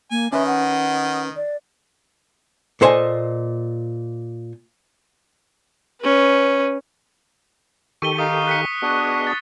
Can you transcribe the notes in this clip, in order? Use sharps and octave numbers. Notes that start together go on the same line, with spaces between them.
A#3 G#5
D#3 C#4 B4 D#5 E5
F#5
D5
A#2 A4 C5 D#5 G#5
C#4 B4
D#3 G4 A4 C#6 D#7 G7
D#4 F5 D#6
F#6 B6 C#7
B3 D4 F#4 G#4 D#5
A6